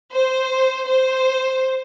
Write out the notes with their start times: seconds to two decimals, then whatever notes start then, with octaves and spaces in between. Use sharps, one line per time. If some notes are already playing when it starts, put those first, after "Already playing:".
0.13 C5
0.86 C5